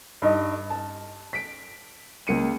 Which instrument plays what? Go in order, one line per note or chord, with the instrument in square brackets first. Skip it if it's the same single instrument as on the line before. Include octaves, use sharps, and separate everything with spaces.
[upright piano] G2 D#4 D#5
A5
B6 D7
C#2 A#3 C#7 D#7